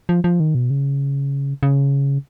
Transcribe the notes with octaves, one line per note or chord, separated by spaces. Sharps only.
F3
F3
D#3
B2
C#3
C#3